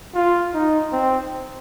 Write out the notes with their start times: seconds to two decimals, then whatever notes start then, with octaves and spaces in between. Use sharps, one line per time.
0.15 F4
0.54 D#4
0.92 C4